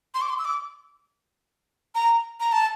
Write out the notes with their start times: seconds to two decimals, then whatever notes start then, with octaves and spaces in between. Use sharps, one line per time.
0.14 C6
0.21 D6
0.29 C6
0.39 E6
0.45 D6
1.95 A#5
2.40 A#5
2.52 A5